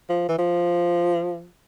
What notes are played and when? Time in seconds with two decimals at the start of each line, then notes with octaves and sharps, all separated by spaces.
0.09 F3
0.28 E3
0.39 F3